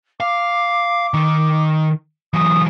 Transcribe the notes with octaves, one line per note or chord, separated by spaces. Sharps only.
F5 D6
D#3
E3 F#3 D#6